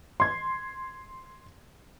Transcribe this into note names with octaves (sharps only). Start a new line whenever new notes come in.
C6 G#6